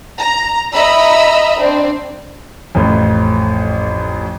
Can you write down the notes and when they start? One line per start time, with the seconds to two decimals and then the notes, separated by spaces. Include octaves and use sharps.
0.18 A#5
0.73 D#5 E5 A#5 B5 E6
1.58 C4 D4
2.75 A1 F2